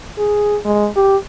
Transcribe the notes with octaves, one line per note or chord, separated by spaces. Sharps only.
G#4
G#3
G4